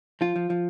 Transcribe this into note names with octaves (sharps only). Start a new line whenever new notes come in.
F3 F4
F3
F3